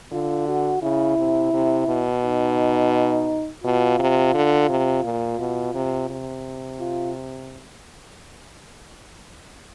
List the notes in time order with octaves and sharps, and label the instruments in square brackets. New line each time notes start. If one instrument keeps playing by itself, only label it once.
[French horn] D3 [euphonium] F4
[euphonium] F#4
[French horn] C#3 [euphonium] E4
[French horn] C3
C3
B2
[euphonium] D#4
[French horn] B2 [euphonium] F4
[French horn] C3
D3
C3
A#2
B2
C3
C3
[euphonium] F4